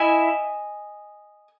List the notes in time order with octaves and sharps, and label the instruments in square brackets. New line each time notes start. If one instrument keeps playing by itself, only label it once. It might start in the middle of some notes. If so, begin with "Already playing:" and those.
Already playing: [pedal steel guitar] E4 E5 [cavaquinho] D#5 G#5